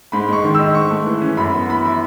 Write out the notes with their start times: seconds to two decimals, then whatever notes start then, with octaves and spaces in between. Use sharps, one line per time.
0.12 G#2 B5
0.29 G#3 C#6
0.44 D#3
0.55 E6
0.59 D#4
0.75 G#2 C#6
0.91 A3
1.07 E3
1.22 C#4
1.37 F#2 B5
1.54 B3
1.69 E3 B5
1.85 E4